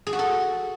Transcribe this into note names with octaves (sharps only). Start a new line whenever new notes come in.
G#4
F#4
A4